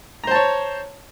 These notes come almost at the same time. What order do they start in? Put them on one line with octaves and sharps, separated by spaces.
A#5 C5 A5 C#5